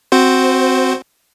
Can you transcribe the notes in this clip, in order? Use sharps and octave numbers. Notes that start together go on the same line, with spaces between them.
C4 F#4 C5